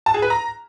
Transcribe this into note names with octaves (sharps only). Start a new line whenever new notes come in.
A5
G#4
B4
A#5